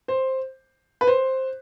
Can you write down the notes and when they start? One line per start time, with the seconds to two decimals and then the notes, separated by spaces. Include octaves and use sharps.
0.08 C5
1.01 B4
1.07 C5